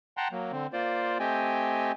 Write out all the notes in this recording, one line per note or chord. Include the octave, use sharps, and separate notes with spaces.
F#5 G5 A5 A#5 C6 F#6
F#3 A#3
D3 C4
A#3 F4 C5 D5
A3 C4 G4 D#5 G5 G#5